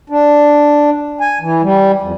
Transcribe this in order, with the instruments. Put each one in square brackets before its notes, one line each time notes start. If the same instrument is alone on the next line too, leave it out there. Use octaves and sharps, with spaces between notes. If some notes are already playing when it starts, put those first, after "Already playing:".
[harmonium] D4
G#5
E3
G3
F2